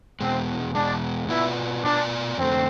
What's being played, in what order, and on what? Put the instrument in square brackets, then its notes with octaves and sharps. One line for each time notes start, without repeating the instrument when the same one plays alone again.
[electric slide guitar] E2 B2 G#3 [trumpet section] C4
[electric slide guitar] E2 B2 G#3 [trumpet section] D4
[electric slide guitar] B2 B3 F4 B4 D5 [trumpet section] E4
[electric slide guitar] B2 B3 F4 B4 D5 [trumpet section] D4
[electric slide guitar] F2 D3 A3 [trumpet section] C4